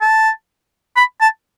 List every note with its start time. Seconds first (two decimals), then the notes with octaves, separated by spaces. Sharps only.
0.01 A5
0.97 B5
1.21 A5